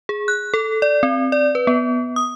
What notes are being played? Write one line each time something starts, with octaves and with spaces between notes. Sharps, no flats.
G#4
F#6
A4
D5
C4
D5
B4
B3
D#6